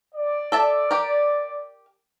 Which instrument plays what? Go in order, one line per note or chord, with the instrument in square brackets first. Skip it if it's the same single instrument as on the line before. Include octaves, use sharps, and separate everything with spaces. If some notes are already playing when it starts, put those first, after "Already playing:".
[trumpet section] D5
[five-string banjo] A4 E5 A5
G4 A#4